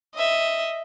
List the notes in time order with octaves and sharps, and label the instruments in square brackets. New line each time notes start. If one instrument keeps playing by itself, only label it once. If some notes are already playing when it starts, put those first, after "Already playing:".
[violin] D#5 E5